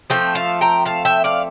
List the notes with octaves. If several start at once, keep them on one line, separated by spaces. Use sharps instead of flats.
F3 A3 C4 G5
F5 A5
G5 A#5
F5 A5
E5 G5
D5 F5